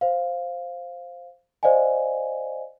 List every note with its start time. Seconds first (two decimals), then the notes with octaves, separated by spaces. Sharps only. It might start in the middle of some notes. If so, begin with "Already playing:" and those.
0.01 C5 F5
1.63 C5 D5 D#5 F5 G#5